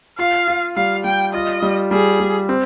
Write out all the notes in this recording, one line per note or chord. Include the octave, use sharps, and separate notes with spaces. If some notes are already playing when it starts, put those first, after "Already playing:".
F4 F5
F4
G3 F5
G3 G5
F4 D#5
G3
G3 G#4
G3
C4